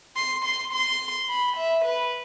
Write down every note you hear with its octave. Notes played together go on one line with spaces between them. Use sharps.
C6
C6
C6
B5
E5
B4